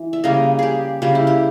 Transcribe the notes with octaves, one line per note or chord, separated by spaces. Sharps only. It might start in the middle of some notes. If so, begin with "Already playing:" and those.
Already playing: E3
E5
C#3 G3 A#3 D#5
G4 G#4
C#3 G3 A#3 G4
E4
G4